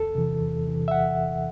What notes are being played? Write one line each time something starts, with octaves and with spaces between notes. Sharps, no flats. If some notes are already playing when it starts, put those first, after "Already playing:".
Already playing: E2 A4
C3 E3
E2
C3 E3
E5
F#5